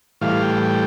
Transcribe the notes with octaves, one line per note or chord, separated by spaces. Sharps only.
A2 E3 G3 F5
G5
G5